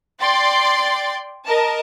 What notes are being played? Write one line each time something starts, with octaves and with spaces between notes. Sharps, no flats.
D5 G5 C6 A6
A#4 D#5 A5